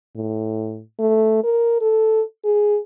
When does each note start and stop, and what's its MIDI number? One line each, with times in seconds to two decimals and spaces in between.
0.16 0.81 45
0.99 1.40 57
1.44 1.78 70
1.81 2.21 69
2.45 2.79 68